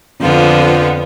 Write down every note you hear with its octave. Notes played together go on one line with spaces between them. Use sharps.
F2 D3 F3 B3 F4